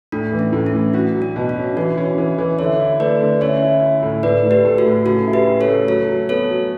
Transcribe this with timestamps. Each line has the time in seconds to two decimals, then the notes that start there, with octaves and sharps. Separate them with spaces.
0.12 A2 D4
0.32 E3
0.39 C#4
0.53 A2
0.66 C#4
0.74 E3
0.94 D4 F#4
1.15 F#3
1.22 D4
1.36 B2
1.49 D4
1.56 C#4
1.76 E3 F#4
1.97 C#4
2.18 E3
2.38 E3
2.59 D3 C#5 E5
2.80 E4
3.00 A3 B4 D5
3.20 D3
3.41 C#4 C#5 E5
3.62 E4
3.82 E4
4.02 A2
4.23 A2 B4 D5
4.45 A2
4.51 G4 B4
4.65 A3
4.78 F#4 A4
4.86 A2
5.06 C#3 F#4 A4
5.27 E4
5.33 G4 B4
5.47 C#3
5.61 A4 C#5
5.67 A3
5.88 F#3 A4 C#5
6.08 F#3
6.29 B3 A4 C#5
6.50 F#3